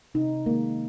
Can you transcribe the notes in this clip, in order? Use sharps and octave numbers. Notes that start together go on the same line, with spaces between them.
C3 D#4
D#3 G#3 A#3